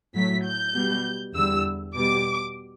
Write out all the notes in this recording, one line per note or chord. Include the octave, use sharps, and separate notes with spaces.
A2 F#3 A3 B6
G6
B2 G3
E2 D3 G3 E6
B2 G3 D6